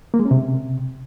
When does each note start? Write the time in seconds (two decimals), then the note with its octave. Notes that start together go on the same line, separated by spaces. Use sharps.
0.14 A#3
0.19 G#3
0.25 C#4
0.31 C3